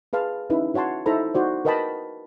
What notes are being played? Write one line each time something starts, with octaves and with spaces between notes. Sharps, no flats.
G#4 B4 F5 A5 C6
C#4 D#4 E4 B4
F#4 C#5 F#5 A5 C6
D#4 E4 A4 C5 A#5 B5
D#4 F#4 C5 D5
A#4 B4 D#5 G5 A5 B5